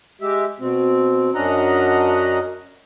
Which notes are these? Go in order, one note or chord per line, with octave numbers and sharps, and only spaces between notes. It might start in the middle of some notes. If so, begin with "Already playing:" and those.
G#3 G4 E5
B2 C4
F#2 C#4 D4 D#5 F#5 A#5